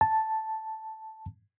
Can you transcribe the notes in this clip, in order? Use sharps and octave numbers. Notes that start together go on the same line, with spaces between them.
A5